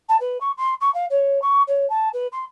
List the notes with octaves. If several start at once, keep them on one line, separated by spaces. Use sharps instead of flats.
A5
B4
C#6
C6
C#6
F5
C#5
C#6
C#5
A5
B4
C6